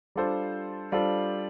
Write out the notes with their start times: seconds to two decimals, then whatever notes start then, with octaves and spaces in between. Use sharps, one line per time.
0.16 G3 D4 F4 A4 C5
0.92 G3 D4 F4 A4 C5